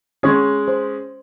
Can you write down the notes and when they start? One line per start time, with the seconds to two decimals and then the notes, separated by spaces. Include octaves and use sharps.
0.23 G#3 C#4 G#4 C#5
0.68 C5